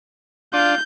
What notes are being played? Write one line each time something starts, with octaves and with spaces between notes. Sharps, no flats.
D4 F4 G6